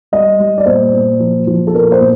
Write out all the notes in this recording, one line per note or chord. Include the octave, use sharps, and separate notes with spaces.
G3 D#5
G3
D5
A#2 C5
A#2
F3
F3
A4
A#2 A#4
C5
A#2